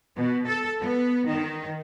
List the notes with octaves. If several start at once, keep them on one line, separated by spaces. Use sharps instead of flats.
B2
A4
B3
D#3